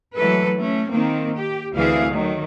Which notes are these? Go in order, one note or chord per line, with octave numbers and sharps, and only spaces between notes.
E3 F#3 G#3 A3 A4 B4
A3 C#4
D#3 A#3 C4
G4
D2 E3 C4 E4 G#4 F5
D#3 F#3 A3